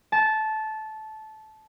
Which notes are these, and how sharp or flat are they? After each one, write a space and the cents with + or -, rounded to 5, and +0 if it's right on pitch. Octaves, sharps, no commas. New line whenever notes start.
A5 -15